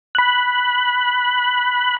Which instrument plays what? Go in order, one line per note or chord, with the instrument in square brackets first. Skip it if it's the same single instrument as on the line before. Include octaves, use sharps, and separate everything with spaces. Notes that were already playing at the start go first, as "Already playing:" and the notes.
[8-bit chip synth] B5 F#6